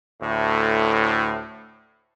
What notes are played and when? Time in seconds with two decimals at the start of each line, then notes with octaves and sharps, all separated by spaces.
0.22 D2 A2